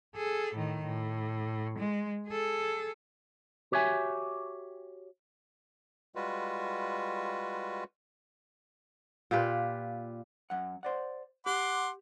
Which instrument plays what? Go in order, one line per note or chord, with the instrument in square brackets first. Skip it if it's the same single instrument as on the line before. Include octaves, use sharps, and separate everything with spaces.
[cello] G#4 A4
A2 D#3
A2
G#3
G#4 A4
[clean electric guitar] F#4 G4 C#5 E5 G#5
[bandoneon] G3 G#3 F4 F#4 B4
[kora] A#2 F4 G4 B4
[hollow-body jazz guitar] F#2 F#5
C5 D5 F#5
[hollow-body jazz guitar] G4 [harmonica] F#5 C6 D6